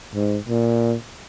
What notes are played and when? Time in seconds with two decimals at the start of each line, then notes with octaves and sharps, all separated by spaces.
0.15 G#2
0.48 A#2